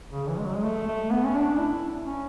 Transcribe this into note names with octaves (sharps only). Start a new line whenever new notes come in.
C#3
E3
G#3
F#3
G#3
A3
A3
B3
C#4
D4
E4
C#4